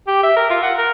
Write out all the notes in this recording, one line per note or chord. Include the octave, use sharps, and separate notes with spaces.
G4
E5
A#4
F4
F#5
A#4